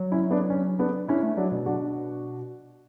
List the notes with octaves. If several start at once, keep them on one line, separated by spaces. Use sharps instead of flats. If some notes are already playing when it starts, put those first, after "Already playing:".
Already playing: F#3
C#4 E4
B3 D4
C#4
B3 D4
C#4 D4 E4
A3
F#3 D4 F#4
B2
D4 F#4